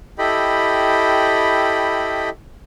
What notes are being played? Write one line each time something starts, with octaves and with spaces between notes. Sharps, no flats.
E4 G4 A4 D#5 G5 B5